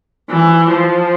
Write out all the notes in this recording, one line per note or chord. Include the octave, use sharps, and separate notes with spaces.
E3
F3